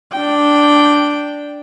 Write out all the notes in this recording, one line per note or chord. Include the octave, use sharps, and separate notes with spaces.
D4 G5